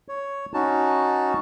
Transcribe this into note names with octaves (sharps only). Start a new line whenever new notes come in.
C#5
C#4 D#4 F#4 A5